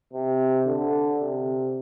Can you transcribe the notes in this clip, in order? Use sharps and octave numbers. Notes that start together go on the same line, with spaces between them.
C3
D3
C3